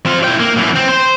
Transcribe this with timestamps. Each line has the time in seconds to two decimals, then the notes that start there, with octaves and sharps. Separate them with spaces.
0.06 C4 F4
0.24 E4 G5
0.40 A#3
0.57 F#2 E3
0.76 C4
0.88 C5